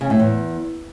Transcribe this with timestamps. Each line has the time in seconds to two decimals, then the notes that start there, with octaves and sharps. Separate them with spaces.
0.01 C#3
0.10 A2
0.19 E2